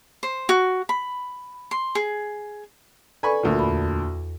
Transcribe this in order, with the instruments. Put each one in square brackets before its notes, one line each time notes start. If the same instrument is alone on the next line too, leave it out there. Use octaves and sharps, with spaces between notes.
[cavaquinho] C5
F#4
B5
C6
G#4
[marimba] A4 B4 D5 [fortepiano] G#5 B5 C#6
[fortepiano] D2 A#2
[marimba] E2 B5